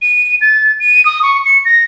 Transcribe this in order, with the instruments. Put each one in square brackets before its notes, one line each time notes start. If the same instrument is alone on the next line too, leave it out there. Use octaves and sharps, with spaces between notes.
[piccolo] D#7
A6
D#7
D#6
C#6
C#7
A#6